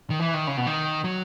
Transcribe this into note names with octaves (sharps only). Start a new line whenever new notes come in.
D#3
E3
D#3
C#3
B2
D#3
F#3